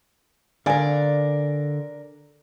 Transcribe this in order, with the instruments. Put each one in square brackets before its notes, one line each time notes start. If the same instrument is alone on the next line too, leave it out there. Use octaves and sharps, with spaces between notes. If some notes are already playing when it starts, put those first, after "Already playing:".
[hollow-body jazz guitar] D3 F5 G#5 [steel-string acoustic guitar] A#4 D5